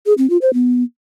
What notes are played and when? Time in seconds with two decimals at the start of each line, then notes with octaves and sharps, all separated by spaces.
0.06 G#4
0.18 C4
0.30 F4
0.42 C5
0.54 B3